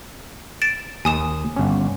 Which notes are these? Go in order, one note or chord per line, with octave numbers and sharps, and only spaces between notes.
A6 D7 E7
D#2 G#5 D#6 E7
G1 C#4